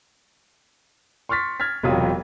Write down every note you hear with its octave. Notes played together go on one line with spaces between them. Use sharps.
C6 C#6 F6 A6 B6
F6 G#6 A6 B6
E1 C3 F#3 F4 D#6